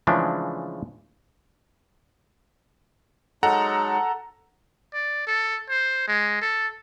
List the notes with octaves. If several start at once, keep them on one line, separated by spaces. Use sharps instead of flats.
C#3 E3 F3 G#3 A3 D4
F#3 G#3 D#4 A4 F#5 A#5
D5
A4
C5
G#3
A4